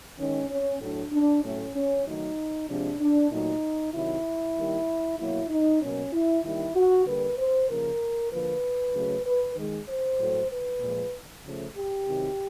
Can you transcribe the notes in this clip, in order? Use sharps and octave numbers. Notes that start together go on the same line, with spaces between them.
D#3 G#3 C#4
C#4
A2 F#3 A3 D4
D4
A2 F#3 A3 C#4
C#4
D#3 F#3 A3 D#4
C3 F3 G#3 D4
D4
A#2 F#3 A3 D#4
C3 D#3 F#3 E4
D#3 G3 A#3
B2 F#3 A#3 E4
D#4
B2 F#3 A#3 C#4
E4
D#3 G3 A#3 E4
F#4
D3 G3 A#3 B4
C5
C#3 F3 A#3 A#4
D3 F3 A#3 B4
C#3 F#3 A3
B4
D#3 G#3
C5
A2 F#3 A3
B4
A#2 F3 G#3
C#3 F3 A3
G4
C3 D#3 F#3